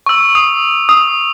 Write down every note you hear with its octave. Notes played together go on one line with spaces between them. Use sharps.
C#6 E6
D#6
D#6